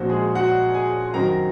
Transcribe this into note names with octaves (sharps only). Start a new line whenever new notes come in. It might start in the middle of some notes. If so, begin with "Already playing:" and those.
Already playing: A#1 A#2 F3 A#3 C4 C#4 F#4 C5
G#3 G#4
F#4 F#5
G#4 G#5
F#2 D#3 F#3 C4 A#4 A#5
A#5